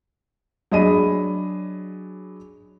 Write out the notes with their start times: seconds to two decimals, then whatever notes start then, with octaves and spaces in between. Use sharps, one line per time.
0.72 F#3 D4 G#4 D#5 B5 D#7